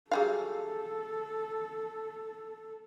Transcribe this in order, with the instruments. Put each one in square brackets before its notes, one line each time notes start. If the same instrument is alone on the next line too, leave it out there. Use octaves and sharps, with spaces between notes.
[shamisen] F#3 G3 F5 [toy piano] D4 G#4 [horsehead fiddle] A4